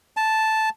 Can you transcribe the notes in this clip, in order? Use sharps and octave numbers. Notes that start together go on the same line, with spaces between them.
A5